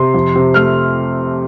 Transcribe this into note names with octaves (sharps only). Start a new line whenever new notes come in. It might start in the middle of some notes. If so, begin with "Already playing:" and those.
Already playing: C3 C6
F2
C3
A3 F6